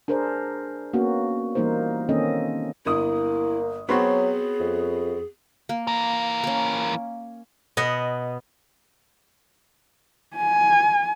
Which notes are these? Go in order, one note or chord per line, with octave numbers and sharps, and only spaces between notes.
D4 G#4 A#4 C5 D5
A#3 B3 C#4 F#4
E3 G3 A#3 D#4 A#4 C5
D#3 A#3 C4 C#4 A4 D#5
G1 A#3 E4 D#6
F#3 B3 C4 F#4 G#4 C#5 B5 C6
F2
A#3
E3 A#4
A#3 C#4
B2 D#5 F#5
G#5